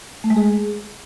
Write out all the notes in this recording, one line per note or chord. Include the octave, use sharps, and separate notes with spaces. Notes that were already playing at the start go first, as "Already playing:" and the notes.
A3
G#3
G#4